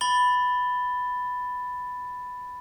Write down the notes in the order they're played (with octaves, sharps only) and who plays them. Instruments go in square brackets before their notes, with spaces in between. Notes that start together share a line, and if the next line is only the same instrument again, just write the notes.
[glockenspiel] B5 A6 G7